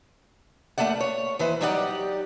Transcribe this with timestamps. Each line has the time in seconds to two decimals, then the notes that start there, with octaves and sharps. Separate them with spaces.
0.78 F2 F3 A3 A#3 D5 F#5
1.00 C#5
1.39 D#2 E3 B4 C5
1.61 F#3 G3 D#4 G4 D5 F#5